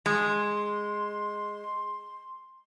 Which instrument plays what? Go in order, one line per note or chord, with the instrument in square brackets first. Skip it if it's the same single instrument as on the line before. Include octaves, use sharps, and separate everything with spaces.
[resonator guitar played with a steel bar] G#3 [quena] C6